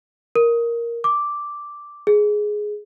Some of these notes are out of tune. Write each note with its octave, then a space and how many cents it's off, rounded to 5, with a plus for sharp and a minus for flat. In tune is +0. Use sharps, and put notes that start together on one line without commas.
A#4 +5
D6 -5
G#4 +10